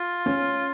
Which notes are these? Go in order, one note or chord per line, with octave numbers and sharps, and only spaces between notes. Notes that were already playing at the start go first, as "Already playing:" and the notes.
Already playing: F4
C#4